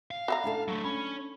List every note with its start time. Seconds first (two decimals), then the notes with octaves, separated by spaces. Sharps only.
0.11 F5
0.28 F#4 E5 A#5 B5
0.44 D4 E4 A4
0.68 F#3 A3
0.84 C#4 B5